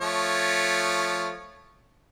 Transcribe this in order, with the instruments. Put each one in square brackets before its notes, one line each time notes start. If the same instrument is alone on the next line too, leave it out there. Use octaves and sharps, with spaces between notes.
[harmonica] F3 A3 C#5